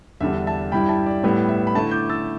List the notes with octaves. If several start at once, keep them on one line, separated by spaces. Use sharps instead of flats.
E2 D3 G3 D4 E5
E5 A5
G2 G3 E4 G5 B5
E5 A5
D5
A2 G3 B3 E4 E5
E5
B5
D3 A3 E4 E5 A5
D6 G6
E6 A6